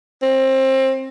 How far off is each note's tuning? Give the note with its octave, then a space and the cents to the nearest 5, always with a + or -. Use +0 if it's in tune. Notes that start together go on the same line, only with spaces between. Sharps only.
C4 +25